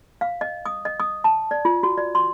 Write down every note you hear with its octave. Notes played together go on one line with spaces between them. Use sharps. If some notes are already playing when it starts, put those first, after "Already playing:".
F5
D#5
D#6
D#5
D#6
A5
D5
F4
F#4
D5
C6